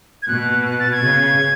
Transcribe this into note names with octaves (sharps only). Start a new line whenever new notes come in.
G#6
B2 F#6
F#6
A6
G#6
C#3